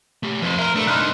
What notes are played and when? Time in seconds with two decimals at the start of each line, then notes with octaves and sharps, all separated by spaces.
0.23 A3 G4
0.42 F2 B4 C5
0.59 A#4 E5 G7
0.75 A3 D4 B4
0.87 C2 D#4 C6 F6 F#6